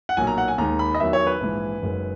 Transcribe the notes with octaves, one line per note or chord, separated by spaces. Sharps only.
F#5
B1 A#2 F#3 G#5
A#5
F#5
G#5
D#2 D#3 G#3 A#5
B5
D#5
E2 D#3 F#3 E5
C#5
B4
A#1 G#2 E3 G#3
F#1 F#2 D#3 G#3